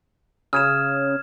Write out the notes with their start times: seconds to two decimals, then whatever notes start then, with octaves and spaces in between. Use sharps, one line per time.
0.53 C#3 D#6 F6 G#6 E7